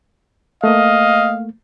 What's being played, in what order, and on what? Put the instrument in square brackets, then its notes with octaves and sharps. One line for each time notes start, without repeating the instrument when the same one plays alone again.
[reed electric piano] A3 A#3 [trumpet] D#5 [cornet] F5